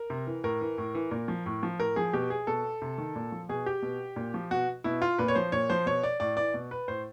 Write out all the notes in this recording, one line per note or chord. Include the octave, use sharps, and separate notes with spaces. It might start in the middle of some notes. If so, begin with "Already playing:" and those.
Already playing: A#4
C3
E3
A2 A#4
E3
A2
E3
A#2
F3
A2
F3
A2 A#4
F3 G#4
B2 G4
G#4
B2 A4
C3
D#3
A#2
F3
B2 G#4
G4
B2
A#2
F3
B2 F#4
B2 E4
F4
A#2 B4
C#5
F3 C5
A#2 C#5
F3 C5
B2 C#5
D5
A2 D5
E3 D5
B2
B4
A2 C5